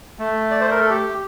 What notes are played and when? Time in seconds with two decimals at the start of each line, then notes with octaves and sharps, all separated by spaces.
0.19 A3
0.51 D5
0.61 C5
0.71 A#4
0.80 A4
0.90 G4